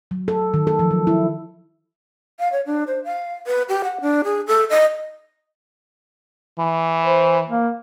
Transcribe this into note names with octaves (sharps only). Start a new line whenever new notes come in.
F#3
A4
D#3
A4
F3
F#3
E4
F5
C#5
D4
C5
F5
B4
G4
F#5
D4
G#4
A4
D#5
E3
C5
A#3